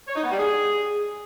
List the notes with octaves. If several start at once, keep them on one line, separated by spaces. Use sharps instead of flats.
C#5
D#4
B3
G3
G#4